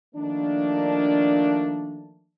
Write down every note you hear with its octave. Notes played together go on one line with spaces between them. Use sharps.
D#3 F3 A3 A#3 D4